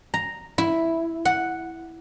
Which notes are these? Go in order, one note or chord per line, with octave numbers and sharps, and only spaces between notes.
A#5
E4
F#5